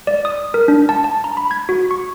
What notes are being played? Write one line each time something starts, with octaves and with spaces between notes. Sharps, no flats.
D5
D#6
A#4
D4
A5
A5
A#5
B5
G#6
F#4
C#6